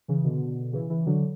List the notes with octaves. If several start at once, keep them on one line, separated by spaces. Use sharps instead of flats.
C#3 E3
B2 D3
C#3 E3
C#3 E3
D3 F#3